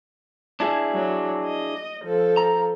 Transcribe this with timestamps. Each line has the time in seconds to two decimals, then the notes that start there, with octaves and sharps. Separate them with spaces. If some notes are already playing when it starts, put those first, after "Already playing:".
0.60 D4 E4 G#4
0.93 F#3
1.44 D#5
2.04 F3 A4
2.37 A#5